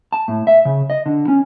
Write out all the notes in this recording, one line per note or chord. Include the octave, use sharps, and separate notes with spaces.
A5
A2
E5
C#3
D#5
D3
C#4